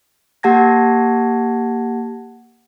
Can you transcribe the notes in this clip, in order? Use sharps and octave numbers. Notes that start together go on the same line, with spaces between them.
A#3 G4 F#5 A5 G#6 A#6